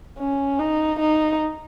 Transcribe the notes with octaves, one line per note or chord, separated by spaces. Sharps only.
C#4
D#4
D#4